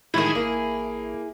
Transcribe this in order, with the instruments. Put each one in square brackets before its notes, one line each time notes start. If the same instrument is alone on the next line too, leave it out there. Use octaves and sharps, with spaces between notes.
[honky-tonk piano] A2 D#3 [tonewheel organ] E3 G#3 D#4 [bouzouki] E4 G#4
[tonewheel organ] A1 [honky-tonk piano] A#3